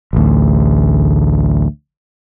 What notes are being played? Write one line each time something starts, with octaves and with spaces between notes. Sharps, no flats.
A1 D2